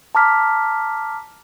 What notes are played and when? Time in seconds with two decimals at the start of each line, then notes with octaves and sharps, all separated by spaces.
0.15 A5 A#5 D6 F6 B6